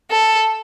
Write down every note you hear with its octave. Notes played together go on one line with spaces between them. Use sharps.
A4